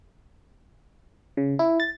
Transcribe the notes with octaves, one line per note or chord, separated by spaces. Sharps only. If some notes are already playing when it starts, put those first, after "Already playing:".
C#3
E4
A6